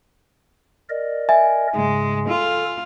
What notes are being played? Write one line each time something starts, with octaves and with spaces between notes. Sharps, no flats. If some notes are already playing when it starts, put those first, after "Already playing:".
A#4 D5 D#5
E5 G#5
G#2 C#3 G#3
F4 A4